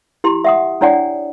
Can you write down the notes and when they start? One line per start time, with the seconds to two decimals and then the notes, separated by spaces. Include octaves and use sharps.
0.24 E4 G4 C6
0.45 E5 F#5 D#6
0.81 D4 E4 C#5 D5 F#5 G#5